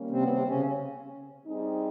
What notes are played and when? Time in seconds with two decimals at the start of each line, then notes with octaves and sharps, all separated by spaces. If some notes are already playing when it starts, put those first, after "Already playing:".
Already playing: D#3 G3 A#3 C#4
0.10 C3 C4
0.22 B3
0.29 C3 C4
0.48 C#3 C#4
1.44 G3 C4 D#4 G#4